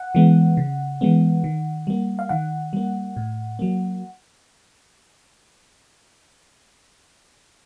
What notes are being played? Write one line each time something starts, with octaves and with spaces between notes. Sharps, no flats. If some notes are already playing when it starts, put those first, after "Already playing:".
Already playing: F#5
E3 G#3 B3
C#3
E3 G#3 B3
D#3
G3 A#3
F5
D#3 F#5
G3 A#3
A2
F#3 A#3